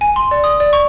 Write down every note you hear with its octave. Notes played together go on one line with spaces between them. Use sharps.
G#5
C6
D5
D#6
D5
C#6